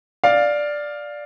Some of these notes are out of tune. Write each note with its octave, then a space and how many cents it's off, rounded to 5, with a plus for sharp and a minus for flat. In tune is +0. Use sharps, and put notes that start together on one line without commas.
D5 +0 F5 +5